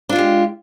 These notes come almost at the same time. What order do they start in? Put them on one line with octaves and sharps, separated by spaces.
D4 F4 G#3 G4